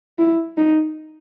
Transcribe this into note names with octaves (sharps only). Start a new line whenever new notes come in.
E4
D#4